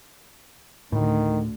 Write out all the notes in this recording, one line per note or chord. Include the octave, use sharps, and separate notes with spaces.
D2 A2 D#3